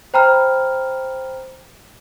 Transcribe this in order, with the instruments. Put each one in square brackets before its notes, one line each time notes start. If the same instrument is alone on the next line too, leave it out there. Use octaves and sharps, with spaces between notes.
[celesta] C5 G5 A#5 B5 F6